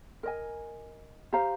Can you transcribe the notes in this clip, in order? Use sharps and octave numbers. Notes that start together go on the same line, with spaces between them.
A#4 D#5 G#5
G4 C5 F5 A#5